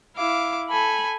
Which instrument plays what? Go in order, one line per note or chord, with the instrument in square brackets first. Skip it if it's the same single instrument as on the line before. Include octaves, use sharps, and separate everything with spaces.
[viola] E4 [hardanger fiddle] F5 D6
[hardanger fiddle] A4 G#5 [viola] B5